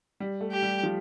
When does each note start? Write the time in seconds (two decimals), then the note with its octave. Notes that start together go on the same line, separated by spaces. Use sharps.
0.20 G3
0.41 A3
0.52 G4
0.63 G3
0.83 F3